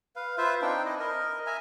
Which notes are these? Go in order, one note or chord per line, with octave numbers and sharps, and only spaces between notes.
B4 F5
F4 B4 C5 E5
C4 D4 D#4 G5
E4 D#5
A#4 D#5
E5 G#5 A#5